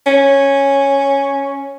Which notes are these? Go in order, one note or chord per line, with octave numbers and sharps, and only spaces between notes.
C#4